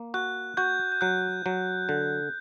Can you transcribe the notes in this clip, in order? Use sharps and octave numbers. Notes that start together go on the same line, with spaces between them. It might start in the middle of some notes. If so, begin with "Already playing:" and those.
Already playing: A#3
F#4 F#6
F#4 G6
G6
F#3 F#6
F#3
D3